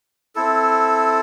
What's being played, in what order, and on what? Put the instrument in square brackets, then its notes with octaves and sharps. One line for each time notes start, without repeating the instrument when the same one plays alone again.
[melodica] C4 E4 A4